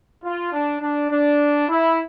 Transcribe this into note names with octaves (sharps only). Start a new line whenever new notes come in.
F4
D4
D4
D4
E4